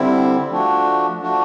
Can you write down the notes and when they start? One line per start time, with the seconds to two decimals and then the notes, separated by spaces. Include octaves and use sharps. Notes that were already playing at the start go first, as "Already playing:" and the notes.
Already playing: D3 G3 C4 E4
0.50 F3 A3 D4 F#4
1.21 F3 A3 D4 F#4